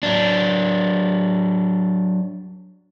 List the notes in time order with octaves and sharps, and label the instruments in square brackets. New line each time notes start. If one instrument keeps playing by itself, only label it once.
[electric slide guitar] F#3 D4